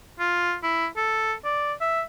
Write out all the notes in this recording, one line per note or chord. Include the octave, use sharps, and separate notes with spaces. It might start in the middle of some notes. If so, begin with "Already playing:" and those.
F4
E4
A4
D5
E5